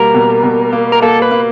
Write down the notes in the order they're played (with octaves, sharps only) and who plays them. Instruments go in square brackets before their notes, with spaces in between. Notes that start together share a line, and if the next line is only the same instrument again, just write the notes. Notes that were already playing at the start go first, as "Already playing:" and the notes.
Already playing: [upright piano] B2 G3 A#3 [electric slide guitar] A#4
[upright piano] B2
B2
A#3
[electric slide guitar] A#4
[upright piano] A#3 [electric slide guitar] A4
[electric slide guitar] B4
[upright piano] A#3